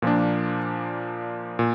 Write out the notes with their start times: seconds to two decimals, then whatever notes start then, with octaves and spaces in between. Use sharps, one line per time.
0.02 A#2 F3 A#3 D4
1.59 A#2